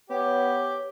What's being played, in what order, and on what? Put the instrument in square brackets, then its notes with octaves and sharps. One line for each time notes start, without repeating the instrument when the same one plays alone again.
[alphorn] B3 [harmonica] G4 [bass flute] C#5